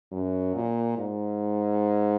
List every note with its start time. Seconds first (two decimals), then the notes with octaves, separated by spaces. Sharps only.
0.12 F#2
0.55 A#2
0.98 G#2